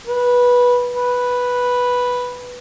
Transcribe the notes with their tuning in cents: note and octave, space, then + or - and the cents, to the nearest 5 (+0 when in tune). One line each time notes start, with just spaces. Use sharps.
B4 -15
B4 -5